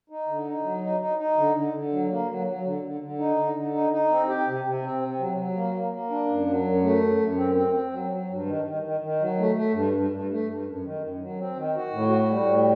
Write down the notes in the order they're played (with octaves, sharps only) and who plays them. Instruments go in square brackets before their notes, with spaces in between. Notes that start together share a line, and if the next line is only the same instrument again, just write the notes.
[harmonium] D#4
D3
D#4
F#3
D#4
D#4
D#4
D3
D3
D3
F#3
A#3
F#3
F#3
D3
D3
D3
D#4
D3
D3
D#4
D#4
C4
G4
C3
C3
C4
C3
F#3
F#3
A#3
A#3
A#3
D4
F#2
F#3
F#2
A3
F#2
F#2
C4
C4
C4
F#3
F#3
G2
D#3
D#3
D#3
D#3
F#3
A3
A3
G2
G2
G2
A3
G2
F#2
D#3
F#2
F#3
C4
D#3
F#4
A2
F#4
G3
A2